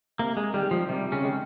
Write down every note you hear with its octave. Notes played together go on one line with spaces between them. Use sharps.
C3 A#3
G#3
D#3 G3 G#3
F3
C3 G3
C#3 C#4
D#3 G#3